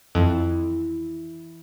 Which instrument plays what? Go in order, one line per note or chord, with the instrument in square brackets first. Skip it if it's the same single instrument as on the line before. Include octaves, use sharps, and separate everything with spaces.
[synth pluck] F2 [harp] E3 E4